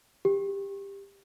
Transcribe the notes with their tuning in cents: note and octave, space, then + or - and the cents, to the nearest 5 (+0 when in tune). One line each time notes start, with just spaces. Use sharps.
G4 +15